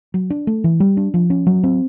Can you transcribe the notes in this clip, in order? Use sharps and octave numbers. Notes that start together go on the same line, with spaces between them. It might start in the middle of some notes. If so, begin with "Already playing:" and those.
F#3
D4
A3
E3
G3
D4
F3
C#4
F#3
C4